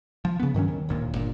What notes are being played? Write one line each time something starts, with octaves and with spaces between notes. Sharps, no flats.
F3
C#3 B3
G2 D#3 F#3 C#4
D#2
D1 D#2 A#2
G1 A#2